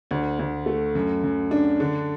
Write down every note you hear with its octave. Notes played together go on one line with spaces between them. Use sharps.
D2
D2
A3
F#2
F#2
D4
D3